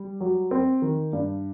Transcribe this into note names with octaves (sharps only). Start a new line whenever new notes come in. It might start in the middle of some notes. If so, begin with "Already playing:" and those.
Already playing: G3
F#3
C4
D#3
G2